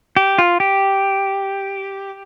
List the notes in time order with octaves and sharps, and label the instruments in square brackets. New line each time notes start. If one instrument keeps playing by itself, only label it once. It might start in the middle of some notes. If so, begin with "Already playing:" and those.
[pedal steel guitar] G4
F4
G4